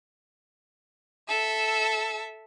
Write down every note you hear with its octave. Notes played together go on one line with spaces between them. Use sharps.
A4 E5